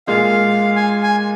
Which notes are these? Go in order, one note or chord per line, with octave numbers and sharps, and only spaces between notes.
A#2 G#3 F4 F5
G#5
G#5